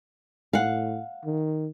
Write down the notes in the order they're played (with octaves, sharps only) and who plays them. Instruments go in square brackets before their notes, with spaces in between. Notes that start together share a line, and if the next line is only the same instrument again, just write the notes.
[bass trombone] A2 [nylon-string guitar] F5 F#5
[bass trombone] D#3